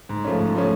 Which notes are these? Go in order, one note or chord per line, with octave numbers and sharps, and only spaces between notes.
G#2
F3 A3 C#4
G#2
F3 A3 C#4